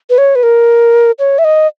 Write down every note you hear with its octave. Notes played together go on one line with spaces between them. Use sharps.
B4
C#5
B4
A#4
C#5
E5
D#5